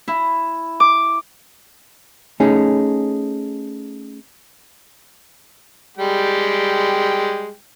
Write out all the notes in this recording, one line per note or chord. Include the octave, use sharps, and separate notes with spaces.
E4
D6
A3 C#4 D#4 G#4
G3 G#3 G5